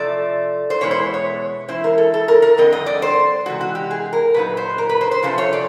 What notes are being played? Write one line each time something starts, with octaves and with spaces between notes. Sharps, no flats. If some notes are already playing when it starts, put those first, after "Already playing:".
Already playing: C3 F3 A3 D5
C5
E2 B2 G#3 B3 E4 C#5
C5
C#5
E3 G#3 C#4 E4 C5
A#4
A4
A4
A#4
A#4
F2 D3 G3 C4 D#5
D#5
D5
C5
C3 E3 G#3 F#4
F#4
G4
G#4
A#4
A#2 F#3 B3 D#4 B4
C5
A#4
B4
C5
C5
C3 F3 A3 C#4 F4 C5
C#5
D5